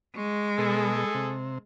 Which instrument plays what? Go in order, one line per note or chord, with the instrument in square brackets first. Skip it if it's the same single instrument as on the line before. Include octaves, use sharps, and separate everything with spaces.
[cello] G#3 [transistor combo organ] C#6
[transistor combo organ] B2 [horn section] G#4 A4
[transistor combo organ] C3